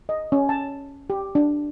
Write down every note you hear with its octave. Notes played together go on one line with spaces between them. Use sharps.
D#5
C#4
A5
G4
D4